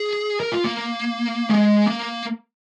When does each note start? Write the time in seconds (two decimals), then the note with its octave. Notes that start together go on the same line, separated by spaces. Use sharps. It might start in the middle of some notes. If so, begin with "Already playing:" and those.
Already playing: G#4
0.40 A#4
0.52 F4
0.64 A#3
1.49 G#3
1.86 A#3